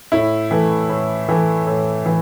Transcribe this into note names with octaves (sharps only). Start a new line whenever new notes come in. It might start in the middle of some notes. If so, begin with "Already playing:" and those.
A2 E4
E3 A3
A2
E3 A3
A2
E3